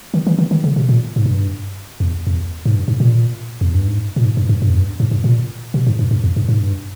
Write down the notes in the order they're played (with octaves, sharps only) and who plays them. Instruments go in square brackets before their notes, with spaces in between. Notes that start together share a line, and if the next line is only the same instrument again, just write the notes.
[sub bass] D#3
E3
D#3
D#3
C#3
B2
A#2
G#2
G2
E2
E2
G#2
G2
G#2
A#2
E2
G2
G#2
A#2
G#2
G2
G2
G2
E2
G2
G#2
G2
A#2
B2
G#2
G2
G2
E2
G2
G#2
G2